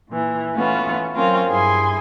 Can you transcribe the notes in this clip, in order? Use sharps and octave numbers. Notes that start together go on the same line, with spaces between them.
A#2 E3
E3 A3 B3 C#4 F4 F#4
F#3 C4 C#4 F4 A#4
G2 E4 G#4 G#5 C6